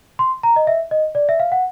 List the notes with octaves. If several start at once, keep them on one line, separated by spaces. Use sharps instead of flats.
C6
A#5
D#5
E5
D#5
D5
E5
F5
F#5